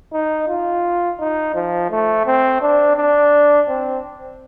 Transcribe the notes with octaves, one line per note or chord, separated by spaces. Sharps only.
D#4
F4
D#4
F3
A3
C4
D4
D4
C4